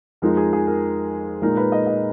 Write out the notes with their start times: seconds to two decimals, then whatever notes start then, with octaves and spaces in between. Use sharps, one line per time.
0.22 F2 F3 G#3 D#4 A#4
0.37 G#4
0.53 G#4
0.67 A#4
1.42 A#2 G#3 D#4 A#4
1.57 B4
1.72 D#5
1.87 D#5